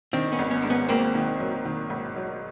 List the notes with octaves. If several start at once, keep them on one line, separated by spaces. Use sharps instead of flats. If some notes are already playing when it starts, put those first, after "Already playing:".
D#3 C4 D4
B3 C#4
G#1
B3 C#4
G#2 D4
B3 C#4
G#1 A#3 C4
D#3
F#3
D#3
G#1
F#3